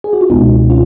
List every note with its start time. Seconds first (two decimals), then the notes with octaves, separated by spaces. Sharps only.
0.04 G#4
0.13 F#4
0.21 F4
0.30 C#2 B2 G#3 B3 D#4
0.70 C#4 F4